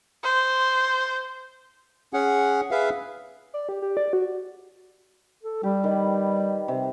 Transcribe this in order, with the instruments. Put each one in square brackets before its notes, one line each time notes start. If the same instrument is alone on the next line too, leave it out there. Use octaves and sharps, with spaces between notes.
[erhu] C5
[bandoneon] C#4 G#4 F#5
G#4 B4 E5 F5
[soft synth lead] D5
G4
G4
D5
F#4
[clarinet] A4
[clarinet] G3 [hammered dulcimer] G4
[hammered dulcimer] D#3 B4
C3